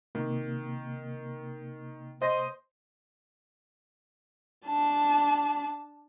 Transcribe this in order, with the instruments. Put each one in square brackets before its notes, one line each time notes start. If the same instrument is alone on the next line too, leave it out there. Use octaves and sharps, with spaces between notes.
[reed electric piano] C3 A#3 [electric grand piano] D#3
[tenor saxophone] C5 [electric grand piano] D#5 A#6
[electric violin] D4 A5